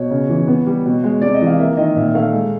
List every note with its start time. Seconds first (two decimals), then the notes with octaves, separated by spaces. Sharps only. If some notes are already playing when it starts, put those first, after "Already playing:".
Already playing: B2 C#5
0.11 C#3
0.29 E3
0.48 B3
0.66 G3
0.86 B2
1.04 G#3
1.22 C3 D5
1.35 D#5
1.41 E3
1.46 F5
1.59 A#3 E5
1.77 D#3 D#5
1.96 A#2 E5
2.15 A3 F5
2.33 G#3